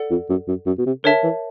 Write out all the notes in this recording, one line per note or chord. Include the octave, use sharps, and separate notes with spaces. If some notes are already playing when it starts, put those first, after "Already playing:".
Already playing: A4 D5 F#5
F2
F#2
F#2
F#2
B2
C3
D3 A#4 C#5 E5 A5
E3